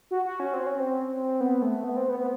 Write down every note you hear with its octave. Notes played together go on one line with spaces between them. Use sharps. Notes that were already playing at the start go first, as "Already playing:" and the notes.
F#4
F#4
C#4
C4
C#4
C4
B3
A3
B3
C4
B3
B3